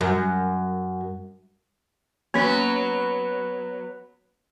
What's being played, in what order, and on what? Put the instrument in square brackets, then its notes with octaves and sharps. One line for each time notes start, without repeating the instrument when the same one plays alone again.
[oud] F#2
[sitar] F#3 B3 [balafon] A#3 C#4